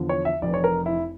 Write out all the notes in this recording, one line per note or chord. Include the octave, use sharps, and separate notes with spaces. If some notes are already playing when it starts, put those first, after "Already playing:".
Already playing: E2 D3 F3
C#5
E5
F1 F2 E3 D5
C#5
A#4
E4